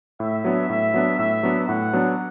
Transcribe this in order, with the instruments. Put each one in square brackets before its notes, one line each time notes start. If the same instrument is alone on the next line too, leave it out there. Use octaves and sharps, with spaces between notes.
[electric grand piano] A2 [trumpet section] E5
[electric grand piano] F#3 B3 D4
[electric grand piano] A2 [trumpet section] E5
[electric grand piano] F#3 B3 D4
[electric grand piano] A2 [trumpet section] E5
[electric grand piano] F#3 B3 D4
[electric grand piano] A2 [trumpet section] F#5
[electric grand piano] F#3 B3 D4